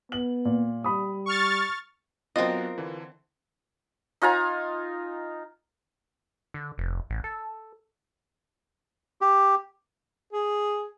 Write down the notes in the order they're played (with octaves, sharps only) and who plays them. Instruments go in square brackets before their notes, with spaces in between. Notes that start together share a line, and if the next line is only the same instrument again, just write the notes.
[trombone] B3 [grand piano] F#7
[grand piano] A#2
[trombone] G3 [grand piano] B5 D#6
[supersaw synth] C#6 F6 A6
[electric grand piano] F#3 B3 D4 [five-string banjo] C4 D#5 [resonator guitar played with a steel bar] F4 A#4
[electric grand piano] D3 E3
[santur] D#4 F4 G#5 A#5
[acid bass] D3
F1
A1
A4
[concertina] G4
[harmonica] G#4